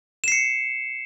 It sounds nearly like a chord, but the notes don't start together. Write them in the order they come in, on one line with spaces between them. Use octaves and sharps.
E7 C7 C#7